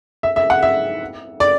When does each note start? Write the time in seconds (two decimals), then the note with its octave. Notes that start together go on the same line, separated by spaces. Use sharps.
0.23 E5
0.36 E5
0.50 F#5
0.63 E5
1.40 D5